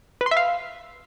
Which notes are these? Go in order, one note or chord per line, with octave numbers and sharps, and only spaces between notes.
B4
C6
E5
F5